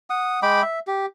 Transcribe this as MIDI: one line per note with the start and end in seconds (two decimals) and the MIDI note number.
0.10 0.40 78
0.10 0.40 87
0.43 0.62 56
0.43 0.62 79
0.43 0.62 83
0.43 0.62 86
0.62 0.79 76
0.87 1.06 67